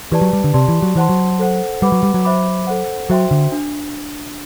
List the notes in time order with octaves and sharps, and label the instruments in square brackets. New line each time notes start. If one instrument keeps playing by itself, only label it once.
[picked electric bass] E3 [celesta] G4 B4 D5 A5
[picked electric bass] F#3
G3
D3
[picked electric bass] C3 [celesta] G4 D5 A5 C6
[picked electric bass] E3
F#3
[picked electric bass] E3 [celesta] C5 F#5 A5 C6
[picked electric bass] F#3
[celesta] A4 C5 F#5
[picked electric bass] G3 [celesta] B4 F#5 B5 D6
[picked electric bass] F#3
G3
F#3
[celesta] C5 E5 B5 D6
A4 C5 F#5
[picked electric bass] F#3 [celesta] F#4 C5 E5 G5 C6
[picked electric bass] D3
[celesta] D4